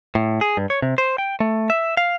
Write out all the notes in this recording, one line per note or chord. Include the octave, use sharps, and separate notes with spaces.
A2
G#4
G2
C#5
C3
C5
G5
A3
E5
F5